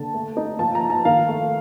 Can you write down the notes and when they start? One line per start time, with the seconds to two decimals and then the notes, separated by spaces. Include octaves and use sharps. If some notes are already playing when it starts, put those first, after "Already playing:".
Already playing: D3 A5
0.14 A3
0.37 D#4
0.59 F3 A5
0.75 A#5
0.82 F3
0.90 A5
1.05 D#3 F5
1.28 A3